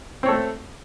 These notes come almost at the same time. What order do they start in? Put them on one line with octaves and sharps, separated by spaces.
C4 C#5 A4 A3